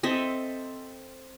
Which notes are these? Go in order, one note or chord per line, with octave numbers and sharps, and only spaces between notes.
C4 A4 D#5 E5